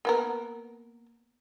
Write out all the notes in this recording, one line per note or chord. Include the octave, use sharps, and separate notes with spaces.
A#3 B3 A#4